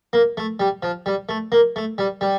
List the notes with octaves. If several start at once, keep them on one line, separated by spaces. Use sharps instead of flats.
A#3
A3
G3
F3
G3
A3
A#3
A3
G3
G3